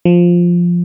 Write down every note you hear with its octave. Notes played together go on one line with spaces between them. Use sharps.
F3